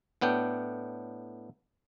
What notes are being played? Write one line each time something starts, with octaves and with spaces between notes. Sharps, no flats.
A2 B3 D4 G5